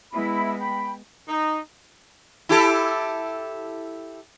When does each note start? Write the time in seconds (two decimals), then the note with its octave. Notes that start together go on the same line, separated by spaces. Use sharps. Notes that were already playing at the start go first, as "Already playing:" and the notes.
0.12 G#3 B3 E4 B5
0.58 G5 B5
1.29 D#4
2.49 E4 G4 A4